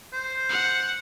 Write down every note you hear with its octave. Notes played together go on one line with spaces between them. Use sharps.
C5
F#5